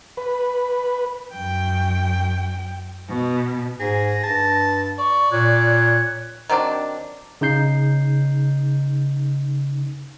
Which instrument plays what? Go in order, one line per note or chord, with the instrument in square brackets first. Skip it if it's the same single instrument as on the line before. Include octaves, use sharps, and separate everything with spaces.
[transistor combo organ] B4
[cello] F#2 G5
B2
[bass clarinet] G#2 [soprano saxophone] G#4 [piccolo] A#6
[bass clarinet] G2 [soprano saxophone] A5
[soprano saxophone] D5 [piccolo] C#6
[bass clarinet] A#2 [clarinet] C#5 [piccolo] F#6
[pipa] D#3 F#3 C4 D4
[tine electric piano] C#3 D#4 G6 C7